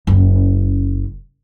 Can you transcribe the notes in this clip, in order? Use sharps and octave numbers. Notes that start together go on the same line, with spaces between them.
F#1 C#4